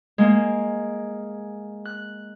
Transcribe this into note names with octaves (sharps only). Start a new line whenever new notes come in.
G#3 A#3
F#6